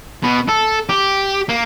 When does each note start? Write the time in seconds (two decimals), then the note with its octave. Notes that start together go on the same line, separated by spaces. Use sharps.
0.24 B2
0.49 A4
0.89 G4
1.49 A#3